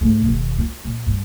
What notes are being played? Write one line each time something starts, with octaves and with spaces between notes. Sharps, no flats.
G#2 A3
E1 D#3
F4
A#2
G2